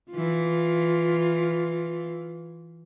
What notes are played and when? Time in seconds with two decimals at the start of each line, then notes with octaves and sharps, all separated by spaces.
0.10 E3 F4